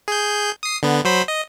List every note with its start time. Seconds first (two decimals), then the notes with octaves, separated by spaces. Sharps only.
0.08 G#4 G6
0.63 D#6 C7
0.83 D3 B3
1.05 F#3 C5 B5
1.28 D#5